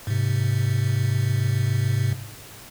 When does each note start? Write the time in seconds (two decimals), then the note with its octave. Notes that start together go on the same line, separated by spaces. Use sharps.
0.07 G#2 C3